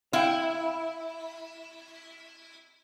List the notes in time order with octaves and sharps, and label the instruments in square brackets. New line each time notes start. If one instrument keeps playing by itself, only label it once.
[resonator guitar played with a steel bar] E4 [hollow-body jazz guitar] F5 G5